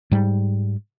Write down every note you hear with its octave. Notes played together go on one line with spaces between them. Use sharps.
G#2 G3